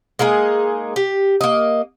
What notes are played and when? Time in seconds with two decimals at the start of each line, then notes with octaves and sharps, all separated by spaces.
0.19 G#3 A#3 D#4 G#4
0.96 G4
1.41 A#3 D#5